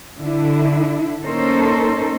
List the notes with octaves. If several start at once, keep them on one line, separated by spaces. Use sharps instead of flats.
D3 D4 E4
A#3 C#4 D#4 A4 A#4 C5